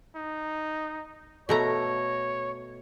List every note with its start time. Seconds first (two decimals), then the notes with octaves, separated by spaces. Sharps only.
0.15 D#4
1.49 B2 A3 C#5 A#5